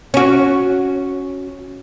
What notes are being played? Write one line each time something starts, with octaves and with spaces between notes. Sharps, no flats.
C#4 F#4